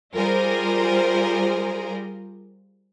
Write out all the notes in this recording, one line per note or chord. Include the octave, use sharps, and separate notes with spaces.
G3 F4 G#4 A#4 C5